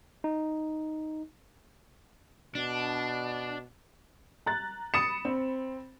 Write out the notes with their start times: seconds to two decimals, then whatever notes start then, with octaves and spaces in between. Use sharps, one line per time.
0.24 D#4
2.55 B2 D4
4.46 A#5 F#6 A6
4.94 B5 D#6 A6 C#7 E7
5.25 C4